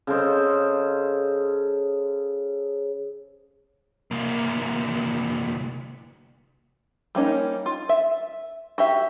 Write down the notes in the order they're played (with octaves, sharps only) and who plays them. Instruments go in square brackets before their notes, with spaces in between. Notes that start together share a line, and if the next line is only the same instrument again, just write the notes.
[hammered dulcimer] C#3 A4 C5 D#5
[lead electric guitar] C2 A#3
[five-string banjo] G3 A#3 C#4 D#4
F4
E5
F#4 G4 E5